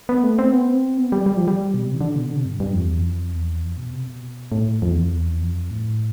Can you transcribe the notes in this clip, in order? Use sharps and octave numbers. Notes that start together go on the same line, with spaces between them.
B3
A3
C4
B3
C4
B3
G3
G3
F3
G3
B2
C3
E3
D3
B2
D3
C3
G2
G2
F2
E2
F2
E2
F2
B2
C3
B2
A2
F2
E2
F2
E2
F2
A2